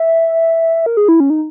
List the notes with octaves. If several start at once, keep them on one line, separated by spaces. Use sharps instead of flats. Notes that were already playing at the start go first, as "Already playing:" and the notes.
Already playing: E5
A#4
G#4
E4
C#4
D#4